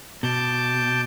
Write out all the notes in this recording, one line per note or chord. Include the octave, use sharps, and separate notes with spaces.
B2 A5 D6 G6